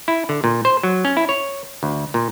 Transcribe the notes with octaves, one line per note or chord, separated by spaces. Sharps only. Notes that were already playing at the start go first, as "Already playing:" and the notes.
E4
D3
A#2
C5
F#3
C#4
E4
C#5
D2
A#2